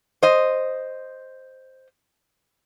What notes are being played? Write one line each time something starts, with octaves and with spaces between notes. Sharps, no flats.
C5 D#5